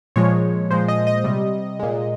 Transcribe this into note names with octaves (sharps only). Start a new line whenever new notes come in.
A#2 F3 G#3 C#5
A#2 F3 G#3 C5
D#5
D#5
C3 G3
A#2 G#3